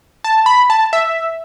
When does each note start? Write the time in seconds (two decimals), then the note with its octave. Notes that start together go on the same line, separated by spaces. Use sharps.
0.24 A5
0.46 B5
0.70 A5
0.93 E5